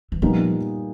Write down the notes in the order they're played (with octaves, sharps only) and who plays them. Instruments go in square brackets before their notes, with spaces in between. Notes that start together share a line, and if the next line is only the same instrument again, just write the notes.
[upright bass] E3
[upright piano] A#2 G3 B3 D#4 [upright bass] F3